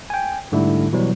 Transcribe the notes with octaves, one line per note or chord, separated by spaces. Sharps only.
G5 G#5
G#2 D3 G3 A3 E4
B2 E3 F#3 G3